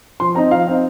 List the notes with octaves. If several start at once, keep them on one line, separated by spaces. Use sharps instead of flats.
F3 C6
C4 D#4 A#5
F3 F5
C4 D#4